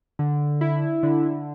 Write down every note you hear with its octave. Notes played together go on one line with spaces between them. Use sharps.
D3
E4
D3